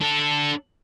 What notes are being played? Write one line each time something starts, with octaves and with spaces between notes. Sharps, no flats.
D4 A4